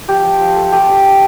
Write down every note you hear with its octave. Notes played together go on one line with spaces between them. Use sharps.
F3 G4
F3
F3
A3
A3 G4
D4
D4